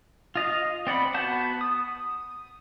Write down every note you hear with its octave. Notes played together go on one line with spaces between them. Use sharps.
F4 D#5 F5
C4 D5 F#5 B5
B3 F#4 F#5 A5 G6
D#6